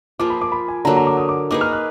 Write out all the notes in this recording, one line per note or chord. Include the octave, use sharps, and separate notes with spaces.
F3 A#3 F4 G#4 D6
B5
D6
B5
G#5
D3 F#3 A#3 A#5
A#5
D6
D#6
D6
A#3 D#4 G#4 B4 D6
F6
F#6